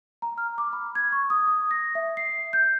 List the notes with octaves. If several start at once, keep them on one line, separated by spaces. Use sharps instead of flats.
A#5
F6
D6
B5
G#6
C#6
D#6
D#6
A#6
E5
C7
G6